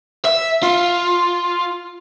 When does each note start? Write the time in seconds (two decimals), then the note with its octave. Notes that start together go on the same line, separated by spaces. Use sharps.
0.25 E5
0.63 F4